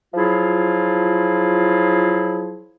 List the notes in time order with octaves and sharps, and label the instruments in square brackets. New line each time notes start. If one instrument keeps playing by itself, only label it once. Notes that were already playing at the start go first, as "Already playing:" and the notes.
[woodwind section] F3 F#3 E4 F4 G#4